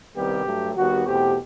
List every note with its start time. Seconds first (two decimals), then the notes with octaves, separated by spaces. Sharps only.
0.15 C2 C3 D#3 G3 B3 G4
0.46 G2 F#3 A3
0.76 D#2 D#3 G3 B3 F#4
1.06 E2 B2 A3 C4 G4